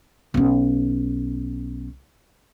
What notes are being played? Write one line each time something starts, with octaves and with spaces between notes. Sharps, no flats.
B1 C#4